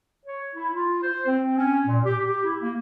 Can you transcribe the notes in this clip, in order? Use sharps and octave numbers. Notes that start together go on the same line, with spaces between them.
C#5
E4
F4
C5
C4
C#4
A#2
G4
G4
E4
A#3